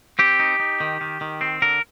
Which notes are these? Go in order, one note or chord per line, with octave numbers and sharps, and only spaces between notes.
C4 G4
D#4
D#4
D#3
D#3
D#3
C4
D3 A#4